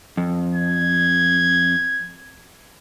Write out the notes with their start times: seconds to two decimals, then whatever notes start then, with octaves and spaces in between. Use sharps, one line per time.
0.17 F2
0.54 G#6